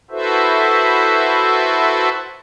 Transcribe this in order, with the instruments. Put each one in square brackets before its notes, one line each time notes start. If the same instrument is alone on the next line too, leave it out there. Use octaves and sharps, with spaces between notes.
[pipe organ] E4 F#4 A4 B4 C5 E5